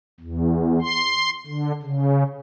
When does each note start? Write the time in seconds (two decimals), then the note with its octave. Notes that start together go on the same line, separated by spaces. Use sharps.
0.20 E2
0.82 C6
1.46 D3
1.82 C#3